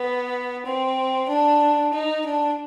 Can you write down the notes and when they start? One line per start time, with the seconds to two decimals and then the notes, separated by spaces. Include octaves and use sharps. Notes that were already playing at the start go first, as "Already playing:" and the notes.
Already playing: B3
0.65 C4
1.28 D4
1.91 D#4
2.23 D4